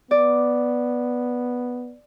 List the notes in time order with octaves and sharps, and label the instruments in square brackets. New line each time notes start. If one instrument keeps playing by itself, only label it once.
[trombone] B3 [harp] D5